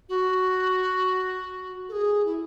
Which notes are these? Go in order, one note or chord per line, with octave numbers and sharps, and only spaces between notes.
F#4
A4
G#4
E4